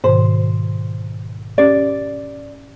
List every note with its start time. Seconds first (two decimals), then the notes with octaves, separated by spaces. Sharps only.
0.04 G#2 B2 D#3 C5
1.58 C#4 G4 D5